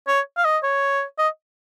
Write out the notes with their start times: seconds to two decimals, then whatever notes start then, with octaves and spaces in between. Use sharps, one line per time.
0.07 C#5
0.37 F5
0.45 D#5
0.63 C#5
1.18 D#5